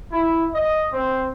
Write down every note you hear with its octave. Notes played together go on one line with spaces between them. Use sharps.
E4
D#5
C4